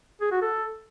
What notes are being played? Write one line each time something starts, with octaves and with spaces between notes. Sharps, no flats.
G#4
F#4
A4